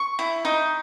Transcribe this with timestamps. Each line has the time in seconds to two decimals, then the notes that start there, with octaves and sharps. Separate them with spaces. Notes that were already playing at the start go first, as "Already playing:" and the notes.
Already playing: C#6
0.19 E4
0.45 D#4